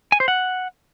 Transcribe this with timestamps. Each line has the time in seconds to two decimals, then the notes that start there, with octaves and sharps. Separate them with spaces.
0.12 G#5
0.20 C5
0.28 F#5